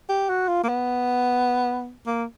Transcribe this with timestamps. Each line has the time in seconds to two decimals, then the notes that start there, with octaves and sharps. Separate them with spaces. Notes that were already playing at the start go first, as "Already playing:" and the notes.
0.09 G4
0.29 F#4
0.48 F4
0.63 A#3
0.68 B3
2.06 A#3